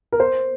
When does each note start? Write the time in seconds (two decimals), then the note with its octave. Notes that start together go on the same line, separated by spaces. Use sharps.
0.12 A#4
0.20 C5